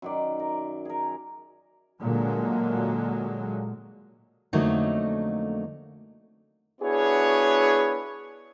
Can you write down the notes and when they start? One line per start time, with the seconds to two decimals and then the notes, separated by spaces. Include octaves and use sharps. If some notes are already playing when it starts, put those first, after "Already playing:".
0.02 F#2 D#3 D5
0.40 A#4
0.85 G#4 A#4
2.01 A#2 D3 F#3 G#3 A#3
4.53 F2 D3 F#3 A3 A#3 D#4
6.81 B3 D4 E4 F#4 G#4 C#5